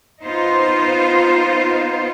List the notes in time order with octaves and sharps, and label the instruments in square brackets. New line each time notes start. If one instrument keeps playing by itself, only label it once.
[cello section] B3 D#4 F4 C5